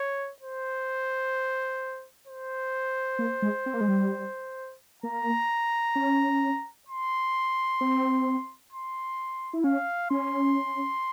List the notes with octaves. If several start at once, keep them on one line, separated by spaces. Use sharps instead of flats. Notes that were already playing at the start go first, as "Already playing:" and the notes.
Already playing: C#5
C5
C5
A#3
G#3
C4
A#3
G#3
G3
A#3 A#5
C#4
C6
C4
C6
E4
C#4 F5
C#4 C6